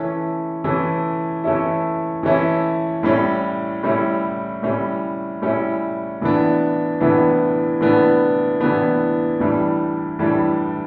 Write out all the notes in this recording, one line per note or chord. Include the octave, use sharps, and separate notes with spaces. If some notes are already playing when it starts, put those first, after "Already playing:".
Already playing: E3 A3 C#4 E4
E3 A3 C#4 E4
E3 A3 C#4 E4
E3 A3 C#4 E4
A2 G3 C#4 E4
A2 G3 C#4 E4
A2 G3 C#4 E4
A2 G3 C#4 E4
A2 E3 B3 D4
A2 E3 B3 D4
A2 E3 B3 D4
A2 E3 B3 D4
A2 E3 G3 D4
A2 E3 G3 D4